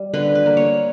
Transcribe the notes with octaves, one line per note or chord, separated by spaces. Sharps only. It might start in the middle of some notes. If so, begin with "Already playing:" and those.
Already playing: G3
D3 B4
B4
A#3
C#5